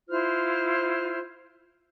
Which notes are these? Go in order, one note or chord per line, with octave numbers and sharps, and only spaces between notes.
E4 F4 C5 F6